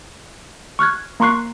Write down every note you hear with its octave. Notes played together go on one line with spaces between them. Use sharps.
C#6 F6 F#6 G#6
A#3 A#5 C6 C#6 F#6 C7